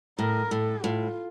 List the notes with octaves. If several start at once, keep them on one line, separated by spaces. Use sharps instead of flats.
A2 A#4
A2 A4
A2 F4